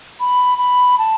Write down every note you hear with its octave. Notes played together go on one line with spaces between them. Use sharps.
B5
B5
A5